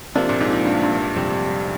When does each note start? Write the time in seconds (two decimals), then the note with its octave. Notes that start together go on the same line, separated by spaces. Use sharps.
0.15 C3 F3 A#3 D4
0.29 A#2
0.41 G#2
0.53 G#2
0.65 G2
0.83 G2
1.16 F2 C3 G3